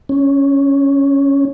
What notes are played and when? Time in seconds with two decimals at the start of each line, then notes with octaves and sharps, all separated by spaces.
0.09 C#4